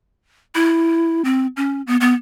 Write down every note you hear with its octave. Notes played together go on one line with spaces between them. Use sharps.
E4
C4
C#4
B3
B3